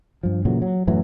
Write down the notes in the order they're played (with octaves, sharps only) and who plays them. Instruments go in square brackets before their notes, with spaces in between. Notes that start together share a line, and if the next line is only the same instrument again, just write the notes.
[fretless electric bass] G2 F3
A#2 C#3 E3 F#3
F#3
F#2 A2 E3 F#3